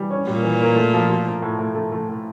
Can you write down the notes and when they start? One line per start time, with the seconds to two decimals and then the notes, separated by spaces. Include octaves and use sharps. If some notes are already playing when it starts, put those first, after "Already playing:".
Already playing: E3 G3
0.10 C#4
0.27 A#2 G3
0.43 E3
0.61 A#3
0.76 A3
0.94 F3
1.10 F3
1.25 F3
1.42 A2
1.59 A2
1.75 A3
1.92 A3
2.09 A2